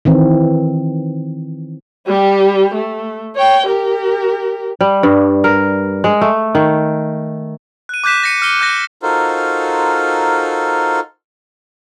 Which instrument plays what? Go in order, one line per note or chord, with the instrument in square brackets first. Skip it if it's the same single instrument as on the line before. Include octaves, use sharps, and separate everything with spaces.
[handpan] D#3 E3 C4
[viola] G3 G4
A3
C#5 G5
G4 A#4
[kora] G3
G2
A#4
G#3
A3
D#3
[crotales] F#6 D#7
D6 F#6 G6 B6 E7
A#6 C#7 D#7
F6 C#7 D#7 G7
F#6 G6 A#6
[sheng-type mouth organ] D#4 F4 F#4 A4 A#4 C5